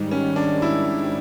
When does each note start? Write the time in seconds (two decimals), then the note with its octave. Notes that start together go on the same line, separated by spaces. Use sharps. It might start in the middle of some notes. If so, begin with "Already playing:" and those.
Already playing: G#2 D#3 G3
0.11 C#4
0.36 D4
0.62 E4